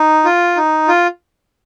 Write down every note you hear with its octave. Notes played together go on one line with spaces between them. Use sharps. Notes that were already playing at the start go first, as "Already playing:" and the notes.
Already playing: D#4
F4
D#4
F4